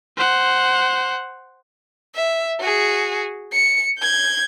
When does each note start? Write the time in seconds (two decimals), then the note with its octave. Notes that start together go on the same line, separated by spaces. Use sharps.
0.17 C5 F#5
2.15 E5
2.60 F#4 G#4
3.52 C#7
4.00 G6 G#6